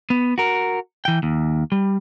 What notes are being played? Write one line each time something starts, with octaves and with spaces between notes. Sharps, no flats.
B3
F#4 A#4
E3 G5
D#2
G3